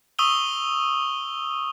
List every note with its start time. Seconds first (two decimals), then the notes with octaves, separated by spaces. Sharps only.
0.19 C#6 D#6 E6 D#7 F7 G7